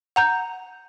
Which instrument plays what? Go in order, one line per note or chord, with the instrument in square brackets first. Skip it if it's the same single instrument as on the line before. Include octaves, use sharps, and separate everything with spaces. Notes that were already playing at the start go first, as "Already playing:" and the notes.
[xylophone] F#5 A#5 G6